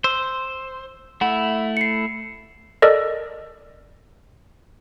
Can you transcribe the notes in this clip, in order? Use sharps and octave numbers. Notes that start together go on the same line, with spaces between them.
C5 E6
A3 E4 F#5
C7 C#7
A4 A#4 D5 D#5